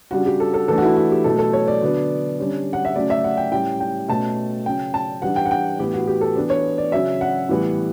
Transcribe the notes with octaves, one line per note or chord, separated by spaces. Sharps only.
C#3 G3 D4 F#4
G4
A4
A4
E3 A3 D4 A4
F#4
E4
F#4
G4
B2 F#3 A3 A4
A4
C#5
D5
D3 F#3 B3 D4
D3 G3 C#4
F#5
E5
C#3 F#3 A3 C#4 D5
E5
F#5
G5
A2 G3 C#4 G5
G5
B2 A3 C#4 A5
C#3 F#3 C#4 G5
A5
E3 G3 D4 F#5
G5
F#5
G5
A2 E3 B3 G4
F#4
G4
A4
E3 B3 D4
C#5
D5
C#3 F#3 C#4 E5
F#5
A2 E3 G3 B3